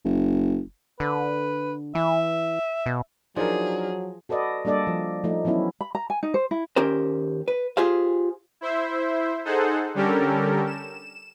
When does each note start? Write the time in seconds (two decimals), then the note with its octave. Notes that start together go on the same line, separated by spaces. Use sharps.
0.05 F#1
1.00 D3 B4
1.95 E3 E5
2.86 B2
3.36 F3 F#3 D4 D#4 G#4 A#4
4.29 F#4 A4 B4 D5 D#5
4.65 G3 A#3 D4 A4 D5 D#5
4.87 F3
5.24 F3 A3 D#4
5.45 E3 F#3 B3 C#4 E4
5.81 B5
5.95 A#5
6.10 G#5
6.23 D#4
6.34 C5
6.51 E4
6.76 D#2 C#4 G4 A#4 C5
7.48 B4
7.77 F4 G4 G#4 C5 F5
8.61 E4 C5 E5
9.45 D#4 G#4 A4 C5 F#5
9.94 D3 G3 C#4 G4 A4 A#4
10.66 E7